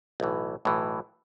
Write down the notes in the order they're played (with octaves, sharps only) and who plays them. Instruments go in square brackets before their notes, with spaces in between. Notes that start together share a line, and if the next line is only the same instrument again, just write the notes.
[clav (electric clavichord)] B1 A2 E3
B1 A2 E3